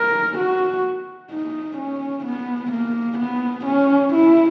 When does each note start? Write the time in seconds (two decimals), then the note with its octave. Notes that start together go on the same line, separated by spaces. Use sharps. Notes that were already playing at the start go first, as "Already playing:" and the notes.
Already playing: A#4
0.37 F#4
1.31 D#4
1.78 C#4
2.25 B3
2.71 A#3
3.19 B3
3.66 C#4
4.13 E4